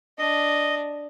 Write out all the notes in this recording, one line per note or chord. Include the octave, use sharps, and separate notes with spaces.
D4 D#5